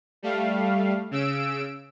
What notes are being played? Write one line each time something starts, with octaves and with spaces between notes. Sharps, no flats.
G3 A3 F5
C#3 E6 D7